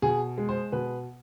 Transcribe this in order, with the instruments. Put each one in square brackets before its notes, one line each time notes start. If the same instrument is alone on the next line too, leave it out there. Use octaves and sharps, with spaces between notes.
[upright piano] B2 G#4
G#3
C5
B2 B4